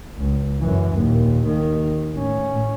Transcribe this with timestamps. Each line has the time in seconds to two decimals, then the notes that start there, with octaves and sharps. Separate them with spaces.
0.17 C#2
0.60 F#2 E3
0.99 D#2 A#2
1.47 D#2 D#3
2.15 A2 C#4